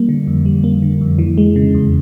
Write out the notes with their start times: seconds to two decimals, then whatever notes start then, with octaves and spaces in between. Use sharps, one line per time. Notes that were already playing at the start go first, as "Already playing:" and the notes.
Already playing: G3 A#3
0.09 D3
0.27 F2
0.46 G3
0.64 A#3
0.82 D3
1.01 F2
1.18 E3
1.38 G#3
1.56 C#3
1.74 E2